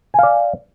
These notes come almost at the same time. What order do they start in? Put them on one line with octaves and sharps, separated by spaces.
G#5 F5 D5